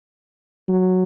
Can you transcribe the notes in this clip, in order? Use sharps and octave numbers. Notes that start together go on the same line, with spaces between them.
F#3